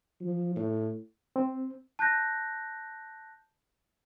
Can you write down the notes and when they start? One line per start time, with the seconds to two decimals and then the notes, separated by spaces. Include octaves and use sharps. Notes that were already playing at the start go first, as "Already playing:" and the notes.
0.21 F3
0.56 A2
1.36 C4
1.99 A5 F#6 G6 A#6